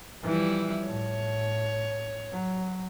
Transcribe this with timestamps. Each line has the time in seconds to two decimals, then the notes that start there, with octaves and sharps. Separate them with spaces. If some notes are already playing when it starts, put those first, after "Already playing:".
0.23 E3 F3 G3 E4
0.85 A2 C#5
2.32 F#3